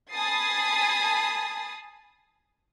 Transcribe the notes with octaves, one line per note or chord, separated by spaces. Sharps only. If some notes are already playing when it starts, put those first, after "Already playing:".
G#5 A5 B5 D#6 A6 C7